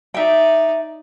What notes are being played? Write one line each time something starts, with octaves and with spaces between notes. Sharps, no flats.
D#4 D5 E5 G5